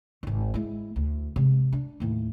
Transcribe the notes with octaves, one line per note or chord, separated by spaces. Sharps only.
G#1 D#3
G#3 E4
D2
C3 G#3
D4
D#2 A2